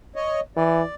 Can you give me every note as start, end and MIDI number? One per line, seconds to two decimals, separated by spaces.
0.16 0.40 73
0.16 0.40 75
0.57 0.82 52
0.57 0.95 74